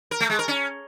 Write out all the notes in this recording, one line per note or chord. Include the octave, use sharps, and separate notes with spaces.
A#4
A3
G#3
A#4
C#4